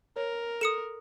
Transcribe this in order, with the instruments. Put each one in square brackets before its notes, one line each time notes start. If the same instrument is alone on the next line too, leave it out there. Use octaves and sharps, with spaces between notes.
[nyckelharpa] A#4 [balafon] C#5
[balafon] A4 [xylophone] D#6 C#7 E7